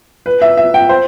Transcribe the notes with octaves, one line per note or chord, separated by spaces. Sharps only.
B4
E5
E5
G5
C5